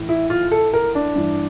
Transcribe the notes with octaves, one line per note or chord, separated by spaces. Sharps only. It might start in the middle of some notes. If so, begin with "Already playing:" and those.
Already playing: A2 E3
E4
F4
A4
A#4
D4
G2 E3